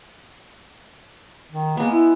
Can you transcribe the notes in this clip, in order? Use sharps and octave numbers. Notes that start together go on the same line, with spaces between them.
D#3
G#3 A#3 B3
E4